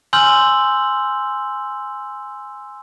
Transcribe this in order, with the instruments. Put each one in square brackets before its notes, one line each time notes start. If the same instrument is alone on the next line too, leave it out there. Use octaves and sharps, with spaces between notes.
[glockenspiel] G#5 C6 E6 F6 G6 F#7